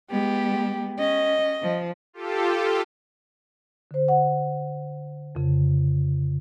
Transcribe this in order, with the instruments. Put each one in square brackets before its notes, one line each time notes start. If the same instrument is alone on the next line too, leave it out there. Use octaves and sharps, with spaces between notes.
[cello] G#3 B3 [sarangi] G4
[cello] C#4 [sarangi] D#5
[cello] F3
[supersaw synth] F4 G4 A4
[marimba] D3 C5
F#5
F2 C#3